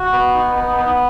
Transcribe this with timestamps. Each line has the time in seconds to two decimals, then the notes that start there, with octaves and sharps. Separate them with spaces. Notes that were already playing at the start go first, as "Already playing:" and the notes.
Already playing: F#4
0.12 B3
0.34 D#4
0.55 B3
0.77 B3